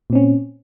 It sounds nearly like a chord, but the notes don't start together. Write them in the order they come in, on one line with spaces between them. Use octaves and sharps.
A#2 C4 C#4